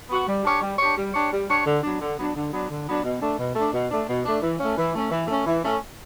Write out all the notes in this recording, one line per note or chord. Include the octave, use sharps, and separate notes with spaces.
B3 F#4
G3
D4 G4 C#5
G3
D4 G4 C#5
G3
D4 G4 C#5
G3
D4 G4 C#5
D3
F#3 B3 D4
D3
F#3 B3 D4
D3
F#3 B3 D4
D3
F#3 B3 D4
B2
A3 D4
B2
A3 D4
B2
A3 D4
B2
A3 D4
E3
A3 C#4
E3
A3 C#4
E3
A3 C#4
E3
A3 C#4